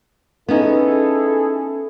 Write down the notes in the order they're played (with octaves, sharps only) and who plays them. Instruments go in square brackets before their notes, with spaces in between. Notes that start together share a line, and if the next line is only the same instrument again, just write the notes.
[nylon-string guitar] B3 C#4 D#4 [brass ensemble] E4 G#4 A4